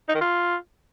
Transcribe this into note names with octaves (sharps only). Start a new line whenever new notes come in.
D#4
D#3
F4